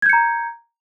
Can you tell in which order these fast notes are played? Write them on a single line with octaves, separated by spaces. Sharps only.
G#6 G6 C#7 A#5